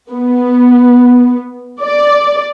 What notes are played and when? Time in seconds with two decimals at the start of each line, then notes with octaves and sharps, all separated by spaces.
0.11 B3
1.83 D5